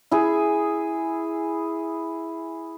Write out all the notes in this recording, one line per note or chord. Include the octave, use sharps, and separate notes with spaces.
E4 G#4